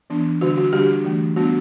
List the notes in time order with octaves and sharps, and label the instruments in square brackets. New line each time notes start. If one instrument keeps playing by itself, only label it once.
[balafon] E3 B3 D4
D3 G3 D4 F#4
F#4
D3 G3 D4 G4
E3 A3 D4
G3 B3 D4 F#4